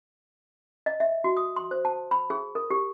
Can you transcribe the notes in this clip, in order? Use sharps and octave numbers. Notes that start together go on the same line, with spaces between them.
D#5
E5
F#4
D#6
C6
C5
A5
B5
G#4
A#4
G4